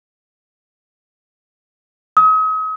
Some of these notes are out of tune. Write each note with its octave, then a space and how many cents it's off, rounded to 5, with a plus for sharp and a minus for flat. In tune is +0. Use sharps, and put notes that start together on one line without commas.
D#6 +40